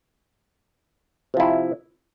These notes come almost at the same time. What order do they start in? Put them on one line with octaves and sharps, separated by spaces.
C3 F3 E4